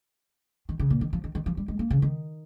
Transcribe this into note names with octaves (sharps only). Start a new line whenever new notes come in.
D#3
C#3
A#2
D#3
F3
D#3
D#3
F3
G3
G#3
A#3
C#3
D#3